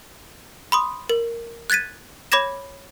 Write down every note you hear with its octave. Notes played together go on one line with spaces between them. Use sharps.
B5 C6 D#6
A#4
F#6 G#6 A6 B6 D#7
C#5 B5 D6 G#6 A#6 E7